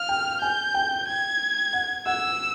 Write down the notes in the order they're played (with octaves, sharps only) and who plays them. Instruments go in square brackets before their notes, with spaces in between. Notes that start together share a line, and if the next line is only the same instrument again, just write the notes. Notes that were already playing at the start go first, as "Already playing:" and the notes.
Already playing: [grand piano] F5 [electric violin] F6
[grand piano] G5
[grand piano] G#5 [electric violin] G6
[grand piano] G5
[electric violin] G#6
[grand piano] F#5
[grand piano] F#5 [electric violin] E6